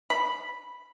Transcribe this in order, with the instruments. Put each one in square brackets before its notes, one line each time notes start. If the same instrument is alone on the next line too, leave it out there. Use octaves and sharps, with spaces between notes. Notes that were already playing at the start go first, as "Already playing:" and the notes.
[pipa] B5